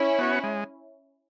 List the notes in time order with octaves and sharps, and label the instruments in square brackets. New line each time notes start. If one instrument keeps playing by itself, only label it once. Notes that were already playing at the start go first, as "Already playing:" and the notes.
Already playing: [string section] C#4 E4
[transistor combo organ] B3 F#4 C#5
G#3